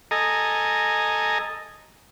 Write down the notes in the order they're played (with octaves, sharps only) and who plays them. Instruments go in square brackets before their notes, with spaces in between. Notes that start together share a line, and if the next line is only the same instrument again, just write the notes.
[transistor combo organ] A4 D#5 G#5 A#5